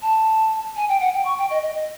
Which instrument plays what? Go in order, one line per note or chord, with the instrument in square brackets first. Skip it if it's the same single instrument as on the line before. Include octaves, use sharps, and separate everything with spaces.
[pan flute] A5
G#5
G5
F#5
G5
C#6
G5
D#5
D#5
D#5